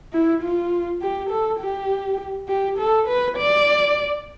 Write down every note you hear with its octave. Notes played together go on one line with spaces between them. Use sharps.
E4
F4
G4
A4
G4
G4
A4
B4
D5